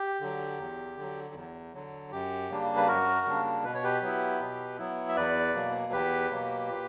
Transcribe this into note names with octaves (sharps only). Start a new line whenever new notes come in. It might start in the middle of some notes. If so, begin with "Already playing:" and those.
Already playing: G4
D3 F#3
E2
D3 F#3
E2
D3 F#3
F#2 G4
C#3 G3 A#3 D4
B4
F#2 F#4 A#4
C#3 G3 A#3 D4
B2 B4
C#5
G4 B4
F#3 B3 E4
B2
F#3 B3 E4
E5
E2 B4 D5
B2 F#3 A#3
E2 G4 B4
B2 F#3 A#3
A#2